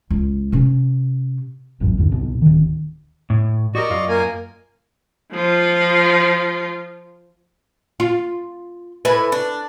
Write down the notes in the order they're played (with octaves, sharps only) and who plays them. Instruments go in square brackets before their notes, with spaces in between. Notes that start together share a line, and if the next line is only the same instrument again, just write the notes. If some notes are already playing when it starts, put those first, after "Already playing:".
[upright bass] C#2
C3 C#4
[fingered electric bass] E1 A1 F#2
E2 G2 D3
C2 B2
D1 D#3
[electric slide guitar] A2
[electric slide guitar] F#4 G4 A#4 [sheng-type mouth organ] D5 D#5 C#6
[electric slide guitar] F#2 F4 F5
[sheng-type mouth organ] A#3 A#4 G#5
[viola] F3 F4
[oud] F4
[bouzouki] A2 E4 G#5 [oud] B4
[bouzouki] D4